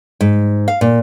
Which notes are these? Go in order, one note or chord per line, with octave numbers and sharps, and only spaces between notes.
G#2
F5
A#2